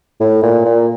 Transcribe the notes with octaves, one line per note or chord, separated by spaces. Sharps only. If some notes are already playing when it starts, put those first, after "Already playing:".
A2
A#2
A#2